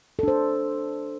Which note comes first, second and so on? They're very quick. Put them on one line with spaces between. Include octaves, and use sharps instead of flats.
A4 D4 C5